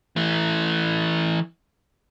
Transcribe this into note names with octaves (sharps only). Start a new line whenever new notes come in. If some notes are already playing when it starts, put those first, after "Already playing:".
E3 A3